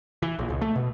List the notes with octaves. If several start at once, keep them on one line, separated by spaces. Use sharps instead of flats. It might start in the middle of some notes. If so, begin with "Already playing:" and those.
E3
A#1
C#2
A3
B2